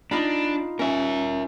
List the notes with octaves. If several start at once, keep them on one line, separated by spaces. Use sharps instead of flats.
D4 D#4 F4 B5
C#4 A#4 E5